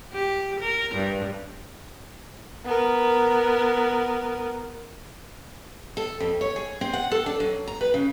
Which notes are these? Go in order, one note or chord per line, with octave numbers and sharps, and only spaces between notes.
G4
A#4
G2
B3 A#4
A4
F2
C#5
G#4
C4
F#5
A4
D4
F#3
A#5
B4
C#3